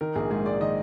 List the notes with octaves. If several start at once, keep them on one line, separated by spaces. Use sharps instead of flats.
D#3 A#4
A#1 G#4
G#2 G#4
G#3 D5
D#3 D#5